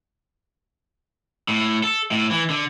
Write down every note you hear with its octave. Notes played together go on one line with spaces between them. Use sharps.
A2
A4
A2
E3
D3